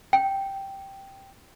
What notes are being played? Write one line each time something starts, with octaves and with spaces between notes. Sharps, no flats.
G5